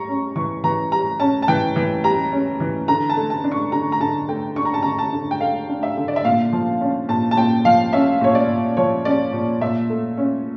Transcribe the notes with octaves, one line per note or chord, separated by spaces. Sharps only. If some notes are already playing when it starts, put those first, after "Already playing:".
Already playing: G3 A#5 C#6
C#4
E3 C#6
E3 A#5
G3 A#5
C#4 A5
A5
E3 G5
E3
G3 A#5
C#4
E3
D3 A#5
A5
A3
A5
D4
C#6
D3 A#5
A#5
D3 A5
A3 G5
D4 C#6
A#5
A5
D3 A#5
A5
D3
G5
A3 F5
D4
E5
D3
D5
E5
A#2 F5
F3
C#4
A#2 A5
A5
A#2 G5
F3 F5
C#4 E5
A#2 C#5
D5
A#2
F3 C#5
C#4 D5
A#2
A#2 E5
A3
C#4